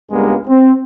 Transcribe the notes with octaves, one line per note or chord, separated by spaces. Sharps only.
C#2 G2 G3 G#3 A#3 B3
C4